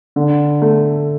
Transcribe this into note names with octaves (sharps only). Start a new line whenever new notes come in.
D3
A3